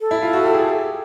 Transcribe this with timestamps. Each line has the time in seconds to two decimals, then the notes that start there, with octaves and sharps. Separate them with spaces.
0.01 A4
0.11 E4
0.22 F4
0.33 F#4
0.44 G4
0.54 G#4
0.66 G4